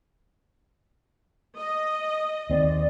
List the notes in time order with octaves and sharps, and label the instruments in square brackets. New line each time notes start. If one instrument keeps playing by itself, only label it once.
[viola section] D#5
[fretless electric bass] D#2 C4 [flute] D5